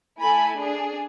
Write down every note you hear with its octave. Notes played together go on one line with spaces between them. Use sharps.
A3 E4 A4 G#5 B5
D4 G#4